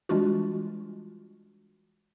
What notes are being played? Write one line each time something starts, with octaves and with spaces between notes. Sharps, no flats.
E3 G3 G#3 D4 F4 F#4